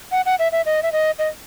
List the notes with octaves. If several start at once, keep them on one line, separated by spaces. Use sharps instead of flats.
F#5
F#5
E5
E5
D#5
E5
D#5
D#5